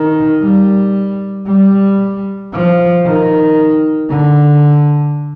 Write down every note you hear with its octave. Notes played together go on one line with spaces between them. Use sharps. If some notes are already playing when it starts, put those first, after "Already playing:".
Already playing: D#3
G3
G3
F3
D#3
D3